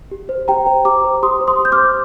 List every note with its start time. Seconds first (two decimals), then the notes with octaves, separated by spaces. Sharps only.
0.11 G4
0.29 C5
0.48 G4 G5 A#5
0.67 C5
0.85 G4 A#5 D6
1.04 C5
1.23 G4 C6 D#6
1.41 C5
1.48 C6 D#6
1.60 G4
1.65 G6
1.72 D6 F6
1.78 C5